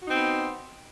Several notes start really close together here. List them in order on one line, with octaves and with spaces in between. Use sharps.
F#4 D#4 C4 B3